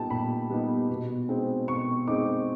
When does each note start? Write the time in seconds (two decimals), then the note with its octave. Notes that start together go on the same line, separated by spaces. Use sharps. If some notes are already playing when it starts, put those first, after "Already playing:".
Already playing: A#2 G3 B3 D#4 G5 A5
0.10 A#2 B5
0.50 G3 B3 D#4
0.90 B2
1.29 G#3 C4 D#4
1.68 B2 C#6
2.08 G#3 C4 D#4 D6